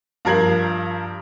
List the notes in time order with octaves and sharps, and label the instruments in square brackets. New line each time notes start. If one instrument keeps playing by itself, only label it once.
[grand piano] G2 F3 A#4 G#6 C7 F#7